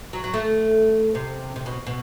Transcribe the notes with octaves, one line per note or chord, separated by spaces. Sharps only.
F#3
F#3
A3
C3
C3
B2
B2